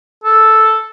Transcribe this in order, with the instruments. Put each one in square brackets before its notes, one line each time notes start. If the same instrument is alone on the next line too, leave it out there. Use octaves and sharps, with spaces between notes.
[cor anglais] A4